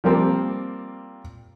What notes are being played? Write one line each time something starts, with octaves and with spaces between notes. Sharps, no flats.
F3 G3 A#3 C4